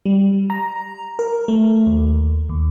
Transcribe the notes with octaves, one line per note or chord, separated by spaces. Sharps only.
G3
A#5
A#4
A3
D#2
D#2